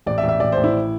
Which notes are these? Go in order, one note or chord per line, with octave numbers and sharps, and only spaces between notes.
A1 D5
E5
A1
E5
A1 D5
C5
A1
E4